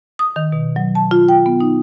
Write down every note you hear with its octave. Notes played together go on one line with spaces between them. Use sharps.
D#6
D#3
B2
F#3
A5
F4
G5
B3
D#4